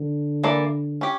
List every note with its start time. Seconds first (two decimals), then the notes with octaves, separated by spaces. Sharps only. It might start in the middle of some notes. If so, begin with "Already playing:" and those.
Already playing: D3
0.44 E3 A#3 D5
1.01 C#4 G4